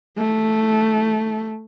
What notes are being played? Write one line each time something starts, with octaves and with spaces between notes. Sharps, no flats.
A3